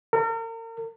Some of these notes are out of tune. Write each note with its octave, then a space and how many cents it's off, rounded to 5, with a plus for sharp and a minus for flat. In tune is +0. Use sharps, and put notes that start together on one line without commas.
A#4 -40